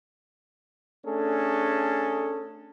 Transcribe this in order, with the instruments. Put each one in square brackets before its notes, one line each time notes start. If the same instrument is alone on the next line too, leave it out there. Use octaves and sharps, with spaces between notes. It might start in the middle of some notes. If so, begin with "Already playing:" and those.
[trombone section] A3 C#4 D4 G#4 A4